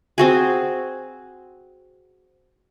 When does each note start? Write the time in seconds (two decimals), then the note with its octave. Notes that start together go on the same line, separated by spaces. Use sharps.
0.18 C4 F#4 G#4